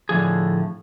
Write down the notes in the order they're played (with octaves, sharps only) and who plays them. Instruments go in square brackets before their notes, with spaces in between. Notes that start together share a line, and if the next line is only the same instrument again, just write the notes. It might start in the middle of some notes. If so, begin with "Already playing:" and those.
[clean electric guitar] A2 D3 F3 G#4